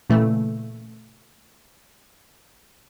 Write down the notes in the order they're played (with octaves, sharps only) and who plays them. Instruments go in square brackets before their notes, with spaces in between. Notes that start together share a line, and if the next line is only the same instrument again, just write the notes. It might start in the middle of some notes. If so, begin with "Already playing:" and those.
[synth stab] A#2 C#3 E3 A3